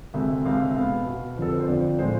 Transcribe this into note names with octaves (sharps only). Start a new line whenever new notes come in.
D2 C3 G#3 E5
D2 C3 G#3 F5
E5
B2 B3 F5
B2 B3
F2 D3 F3 A4
B4
C5
F2 D3 F3 D5
A2 F3 G#3 C5